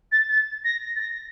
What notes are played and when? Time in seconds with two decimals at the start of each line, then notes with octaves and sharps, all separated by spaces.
0.12 A6
0.29 A6
0.64 A#6
0.96 A6
1.00 A#6